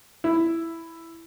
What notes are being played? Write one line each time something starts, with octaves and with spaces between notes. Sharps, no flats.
E4